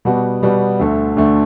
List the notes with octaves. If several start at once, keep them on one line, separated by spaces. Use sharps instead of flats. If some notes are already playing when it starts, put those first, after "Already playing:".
B2 G3 B3 F#4
B2 G3 B3 F#4
D2 D3 A3
D2 D3 A3